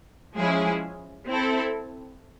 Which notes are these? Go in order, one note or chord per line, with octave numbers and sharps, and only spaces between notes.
F3 G#3 C#4 E4 G#4
C4 E4 A4